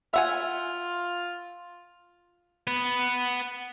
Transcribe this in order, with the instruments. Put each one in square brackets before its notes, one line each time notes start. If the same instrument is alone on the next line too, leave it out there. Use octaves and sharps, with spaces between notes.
[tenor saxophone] F4 [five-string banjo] E5 F#5 G#5
[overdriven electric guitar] B3 B4